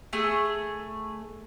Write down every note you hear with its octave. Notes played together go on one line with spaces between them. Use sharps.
A3 G#4